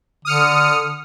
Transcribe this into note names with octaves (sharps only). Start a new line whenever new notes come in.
D3 D#6 F6 C#7